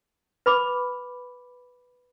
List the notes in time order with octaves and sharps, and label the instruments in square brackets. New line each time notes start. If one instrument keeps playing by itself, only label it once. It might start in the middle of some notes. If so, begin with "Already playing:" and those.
[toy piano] B4 B5 D6